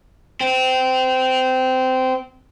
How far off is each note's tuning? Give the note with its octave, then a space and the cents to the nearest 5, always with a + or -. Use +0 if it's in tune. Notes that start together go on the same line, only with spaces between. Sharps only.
C4 -20